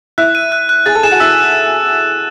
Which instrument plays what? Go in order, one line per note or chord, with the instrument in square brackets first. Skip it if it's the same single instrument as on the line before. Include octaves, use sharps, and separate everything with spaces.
[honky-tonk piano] E4 E5 [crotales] F#6
[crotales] D#7
F#6
F#6
[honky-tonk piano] G#4 G#5 [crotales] A6
[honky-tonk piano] A4 A5
[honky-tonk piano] G#4 G#5 [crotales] E7
[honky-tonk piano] F#4 F#5
[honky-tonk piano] E4 E5 [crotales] E6